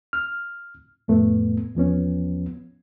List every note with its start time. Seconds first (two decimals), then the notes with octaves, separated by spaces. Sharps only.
0.13 F6
1.08 F2 A2 A3 B3
1.75 E2 F3 B3 C#4